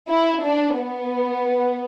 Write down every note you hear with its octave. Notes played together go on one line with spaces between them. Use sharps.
E4
D4
B3